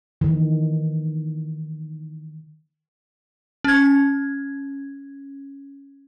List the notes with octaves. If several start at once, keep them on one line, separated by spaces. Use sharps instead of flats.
D#3 E3
C#4 G#6